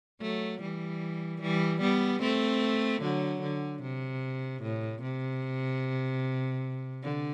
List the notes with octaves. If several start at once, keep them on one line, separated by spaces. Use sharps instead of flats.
F#3 A3
E3 G3
E3 G3
G3 B3
A3 C4
D3 F#3
D3
C3
A2
C3
D3